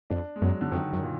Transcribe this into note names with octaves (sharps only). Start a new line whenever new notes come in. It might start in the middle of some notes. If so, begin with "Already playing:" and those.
F2 D4
G#3
F#2 F#3
D3
F2 D#3
F#2
A#2